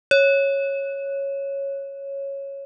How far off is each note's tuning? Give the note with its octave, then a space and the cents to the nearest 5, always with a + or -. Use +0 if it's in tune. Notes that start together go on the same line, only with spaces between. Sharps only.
C#5 -5